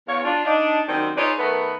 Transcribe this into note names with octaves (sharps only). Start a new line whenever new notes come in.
E2 C#5 F5
D4 F4
D4 D#4
F#2 D#3 G3 C4
D#4 F4 G#4 B4 C#5 D5
D#3 A3 B3 A#4 B4